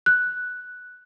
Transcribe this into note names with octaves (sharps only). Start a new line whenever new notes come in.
F#6